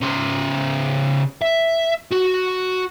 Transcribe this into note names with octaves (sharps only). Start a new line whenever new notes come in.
C#3 C5
E5
F#4